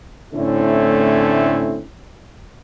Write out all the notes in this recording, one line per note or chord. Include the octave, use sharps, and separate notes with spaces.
A2 D3 A3 C4 C#4 E4